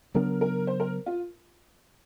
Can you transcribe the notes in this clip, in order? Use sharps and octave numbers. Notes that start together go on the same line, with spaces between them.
C#3 F#3 B3 D4 A#4
A#4
C5
A#4
F4